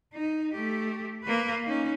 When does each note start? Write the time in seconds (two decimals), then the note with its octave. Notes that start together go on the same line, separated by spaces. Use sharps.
0.14 D#4
0.53 A3 G4
1.23 A#3 B4
1.65 C#4 D#4